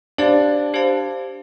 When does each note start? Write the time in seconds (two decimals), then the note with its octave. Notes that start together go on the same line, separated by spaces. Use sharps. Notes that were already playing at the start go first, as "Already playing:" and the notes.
0.18 D4 G4 C5 F5 A5
0.74 G4 C5 F5 A5